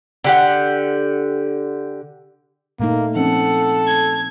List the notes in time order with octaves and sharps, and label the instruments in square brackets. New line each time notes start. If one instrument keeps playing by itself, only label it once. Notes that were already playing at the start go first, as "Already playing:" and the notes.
[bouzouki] D3 G4 F#5
[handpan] A#2 A3 D#4 [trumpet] A#3
[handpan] F3 C4 C#4 [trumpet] A4 [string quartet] F#5
[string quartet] G#6